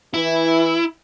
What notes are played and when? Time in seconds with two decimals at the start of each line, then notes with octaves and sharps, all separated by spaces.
0.14 E3 E4